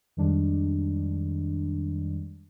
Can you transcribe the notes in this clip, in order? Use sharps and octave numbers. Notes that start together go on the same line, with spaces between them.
F2 D#3 G3 G#3 D4